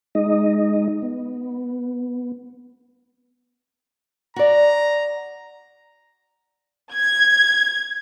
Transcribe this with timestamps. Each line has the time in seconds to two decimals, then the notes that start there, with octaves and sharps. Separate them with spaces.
0.15 G#3 D#4 D#5
1.02 B3
4.36 F#4 D5 A#5
6.93 G#6